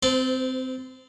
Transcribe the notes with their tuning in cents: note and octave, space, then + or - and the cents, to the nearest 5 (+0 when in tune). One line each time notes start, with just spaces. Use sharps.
C4 -15 C5 -40 A5 +0